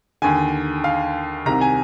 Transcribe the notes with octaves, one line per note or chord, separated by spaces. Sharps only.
D#2 D3 G#5
F5
C2 C3 D#3 A#5
G#5